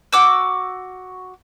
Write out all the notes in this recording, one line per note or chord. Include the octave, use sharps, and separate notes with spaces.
F#4 D6 E6